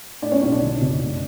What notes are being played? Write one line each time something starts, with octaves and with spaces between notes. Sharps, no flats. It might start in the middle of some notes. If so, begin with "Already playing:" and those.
A2 D4 D5
C#4 C#5
B1 C#4 C#5
D4 D5
D3
F#1
F1